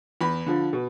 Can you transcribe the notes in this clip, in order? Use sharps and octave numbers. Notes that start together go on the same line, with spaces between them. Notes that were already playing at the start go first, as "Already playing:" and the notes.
E2 B5
D3 F3
B2